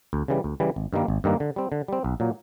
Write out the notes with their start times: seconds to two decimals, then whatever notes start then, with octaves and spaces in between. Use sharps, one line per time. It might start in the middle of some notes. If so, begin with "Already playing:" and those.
0.13 D2
0.28 C#3 E3 G3
0.44 D2
0.60 C#3 E3 G3
0.76 G#1
0.93 G2 D#3 G3 A#3
1.08 G#1
1.24 G2 D#3 G3 A#3
1.40 D3
1.56 G3 C4
1.72 D3
1.88 G3 C4
2.04 B1
2.20 A#2 F#3 A#3